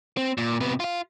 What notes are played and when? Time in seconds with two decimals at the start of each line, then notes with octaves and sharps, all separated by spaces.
0.17 C4
0.38 A#2
0.61 C3 B3
0.80 F4 F5